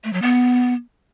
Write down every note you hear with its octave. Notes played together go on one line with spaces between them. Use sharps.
A3
F#3
B3